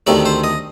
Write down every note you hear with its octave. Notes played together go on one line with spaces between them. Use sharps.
D2 C3 D#3 A3 D5
C5
D#5